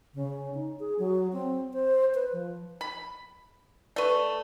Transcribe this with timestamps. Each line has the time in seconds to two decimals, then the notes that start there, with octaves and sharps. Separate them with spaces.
0.14 C#3
0.54 D#4
0.79 G#4
0.99 F#3
1.33 C4
1.73 C5
2.14 B4
2.33 F3
2.81 B5
3.96 A3 B4 D5 C#6